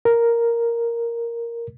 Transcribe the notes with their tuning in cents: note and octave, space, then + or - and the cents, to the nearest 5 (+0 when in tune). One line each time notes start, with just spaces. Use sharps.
A#4 +0